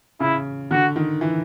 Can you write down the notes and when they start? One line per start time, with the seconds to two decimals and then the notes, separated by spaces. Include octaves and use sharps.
0.20 C#3 E4
0.71 D3 F#4
0.96 D#3
1.21 E3